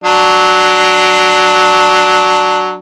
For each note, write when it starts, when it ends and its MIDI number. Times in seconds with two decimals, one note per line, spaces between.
0.04 2.78 54
0.04 2.78 62